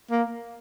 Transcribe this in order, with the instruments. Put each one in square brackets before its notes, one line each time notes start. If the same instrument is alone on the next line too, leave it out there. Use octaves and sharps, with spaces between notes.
[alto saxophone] A#3